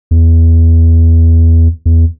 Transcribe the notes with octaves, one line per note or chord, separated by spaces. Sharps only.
E2
E2